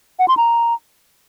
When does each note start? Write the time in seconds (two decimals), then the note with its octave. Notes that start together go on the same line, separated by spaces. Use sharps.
0.19 F#5
0.28 C6
0.37 A#5